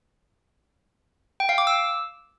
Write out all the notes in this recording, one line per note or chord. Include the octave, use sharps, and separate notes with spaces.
G5
F5
D6
E6